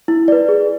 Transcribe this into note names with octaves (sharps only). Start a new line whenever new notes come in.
E4
B4 D5
G#4